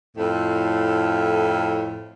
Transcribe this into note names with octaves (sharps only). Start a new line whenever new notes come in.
F2 A2